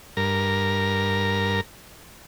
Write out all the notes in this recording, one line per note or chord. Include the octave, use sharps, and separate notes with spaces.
G2 A#4